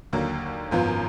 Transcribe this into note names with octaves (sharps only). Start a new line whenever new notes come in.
D#2 D3 F#3 A#3
G#1 F#2 F3 B3 F4